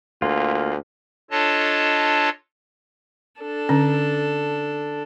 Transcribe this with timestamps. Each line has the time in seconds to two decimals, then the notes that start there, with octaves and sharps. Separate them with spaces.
0.22 D2 A#3 F4
1.31 D4 F4 A4 C#5 D#5 A5
3.40 D4 A4
3.69 D3 C#4